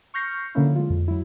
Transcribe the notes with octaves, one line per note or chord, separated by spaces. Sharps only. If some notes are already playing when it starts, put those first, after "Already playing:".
C#6 F6 G6 A#6 C7 C#7
D3 F3 A#3 C#4 E4
G#3 F4
F2
F#3 E4